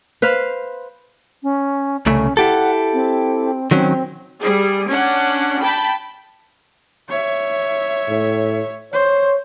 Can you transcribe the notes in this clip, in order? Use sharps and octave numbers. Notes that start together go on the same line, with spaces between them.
B4 C5 F5
C#4
C2 C#3 A3 C#4
E4 G4 A4 F#5
C4
D#3 F#3 C4 C#4
G3 G#4
C#4 D4 F#5
G5 A5 B5
C#5 E5
A2
C5 C#5